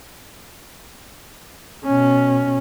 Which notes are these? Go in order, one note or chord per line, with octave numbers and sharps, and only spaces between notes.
B2 C#4